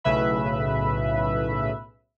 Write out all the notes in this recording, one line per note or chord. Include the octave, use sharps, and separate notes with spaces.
B1 A2 C#3 B4 E5 B5